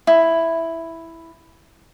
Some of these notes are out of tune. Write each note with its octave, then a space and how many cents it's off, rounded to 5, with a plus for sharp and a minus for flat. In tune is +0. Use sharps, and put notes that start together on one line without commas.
E4 +0